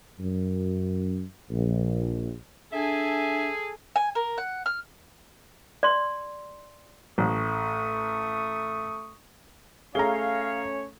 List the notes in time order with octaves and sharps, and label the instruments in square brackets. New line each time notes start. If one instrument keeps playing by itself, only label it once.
[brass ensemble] F#2
A#1
[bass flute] D4 [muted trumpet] G#4 [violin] A4 G#5 [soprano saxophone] E5
[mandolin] G#5
A#4
F#5
F6
[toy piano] D5 C6
[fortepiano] A1 [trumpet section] A3 C#6 D#6
[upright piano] A3 G7 [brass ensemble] C#4 C#5 [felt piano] G#4 A#5 [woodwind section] F5